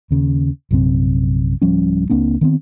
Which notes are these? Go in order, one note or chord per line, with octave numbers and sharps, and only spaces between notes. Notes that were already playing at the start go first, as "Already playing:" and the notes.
D#2 C#3
A#1 F#2 C3 C4
D1 F3 G3 C#4
C#2 A#3 C4 D4
D#3 B3 C4